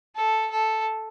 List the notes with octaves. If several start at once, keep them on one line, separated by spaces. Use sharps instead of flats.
A4
A4